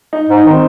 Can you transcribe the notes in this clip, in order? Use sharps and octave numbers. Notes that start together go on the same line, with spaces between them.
D#4
G#2
D#4
D#3
C4